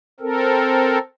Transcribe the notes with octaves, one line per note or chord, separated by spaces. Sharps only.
C4 A4 A#4